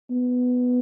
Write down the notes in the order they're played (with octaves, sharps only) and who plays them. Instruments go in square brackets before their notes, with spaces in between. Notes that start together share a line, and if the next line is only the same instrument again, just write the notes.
[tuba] B3